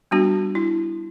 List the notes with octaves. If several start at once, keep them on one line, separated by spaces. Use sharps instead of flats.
G3 B3 D4 F#4
E4